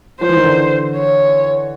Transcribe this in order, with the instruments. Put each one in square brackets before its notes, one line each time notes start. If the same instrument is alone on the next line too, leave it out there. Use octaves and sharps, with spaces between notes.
[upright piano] F3 [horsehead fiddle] C5
[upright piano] E3
D#3
D3 E3
[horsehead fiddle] C#5